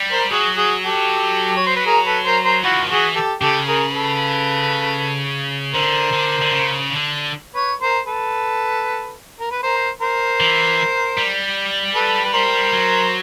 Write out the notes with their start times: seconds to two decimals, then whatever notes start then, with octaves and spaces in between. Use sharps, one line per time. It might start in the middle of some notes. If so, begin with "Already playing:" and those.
Already playing: G3
0.12 A#4 C5
0.30 F#3 F#4 G#4
0.56 F#4 G#4
0.83 G4 A4
1.57 C#5
1.67 C5
1.77 B4
1.86 G#4 A#4
2.06 A4 B4
2.25 A#4 C5
2.44 A#4 C5
2.63 F3 E4 F#4
2.73 D3
2.82 D#3
2.89 E3 F#4 G#4
3.15 G4 A4
3.41 C#3 G4 A4
3.68 G#4 A#4
3.93 A4 B4
5.74 D3 A#4 C5
6.13 D3
6.41 D3
6.52 C#3
6.90 D3
7.55 B4 C#5
7.81 A#4 C5
8.07 A4 B4
9.39 A#4
9.51 B4
9.63 A#4 C5
10.01 A#4 C5
10.40 E3
11.18 G3
11.95 A4 B4
12.25 B4
12.34 A#4 C5
12.73 F#3